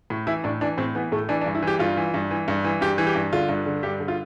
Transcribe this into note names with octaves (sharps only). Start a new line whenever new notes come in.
A2
E3 E4
A2 D4
E3 D4
A2 C4
E3 B3
A2 A3
E3 D4
D4
G2
E4
E3
G4
G2 F4
E3
G2
E3
G2
E3
G2 G4
E3
G4
G2
D3 F4
G2
D3
G2 G4
D3
F4